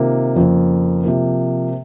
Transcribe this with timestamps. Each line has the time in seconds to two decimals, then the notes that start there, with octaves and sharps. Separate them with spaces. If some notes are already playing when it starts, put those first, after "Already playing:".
Already playing: C3 D#3 A#3 F4
0.36 F2 C#3 F3 A#3
1.04 C3 F3 A#3